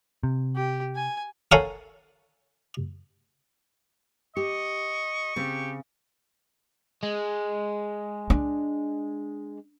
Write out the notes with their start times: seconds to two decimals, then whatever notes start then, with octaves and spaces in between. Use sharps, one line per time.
0.23 C3
0.56 G4
0.96 G#5
1.52 A4 A#4 C#5 F5 F#5 G#5
4.37 G4 D#5 C#6
5.36 C#3 C4 G4
7.03 G#3
8.30 D4